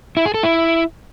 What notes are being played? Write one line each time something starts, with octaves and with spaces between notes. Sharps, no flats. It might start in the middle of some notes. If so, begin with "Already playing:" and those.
E4
G#4
A4
E4